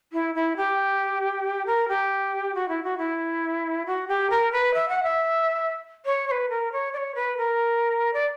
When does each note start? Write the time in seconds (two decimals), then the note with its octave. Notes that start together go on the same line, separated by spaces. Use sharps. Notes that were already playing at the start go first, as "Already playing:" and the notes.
0.13 E4
0.35 E4
0.57 G4
1.66 A#4
1.88 G4
2.55 F#4
2.69 E4
2.83 F#4
2.98 E4
3.86 F#4
4.08 G4
4.30 A#4
4.52 B4
4.74 E5
4.89 F#5
5.03 E5
6.06 C#5
6.28 C#5
6.31 B4
6.50 A#4
6.72 C#5
6.93 D5
6.97 C#5
7.15 B4
7.37 A#4
8.13 D5